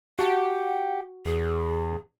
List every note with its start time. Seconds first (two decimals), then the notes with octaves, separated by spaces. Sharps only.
0.19 F#4 G4 F#5 A5
1.25 E2 G#4